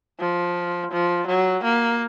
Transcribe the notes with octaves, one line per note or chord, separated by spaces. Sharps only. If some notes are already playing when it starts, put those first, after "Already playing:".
F3
F3
F#3
A#3